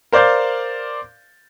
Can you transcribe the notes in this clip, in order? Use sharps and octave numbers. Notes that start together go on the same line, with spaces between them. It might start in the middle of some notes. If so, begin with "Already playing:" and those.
A#4 C5 D5 F5 G6 A6